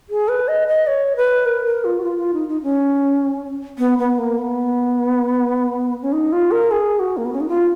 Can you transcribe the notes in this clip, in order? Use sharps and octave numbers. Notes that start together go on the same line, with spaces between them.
G#4
B4
D#5
D#5
C#5
B4
A#4
A#4
F4
F#4
F4
F4
D#4
D#4
C#4
B3
B3
A#3
B3
C#4
D#4
F4
A#4
G#4
F#4
A#3
B3
C#4
D#4
F4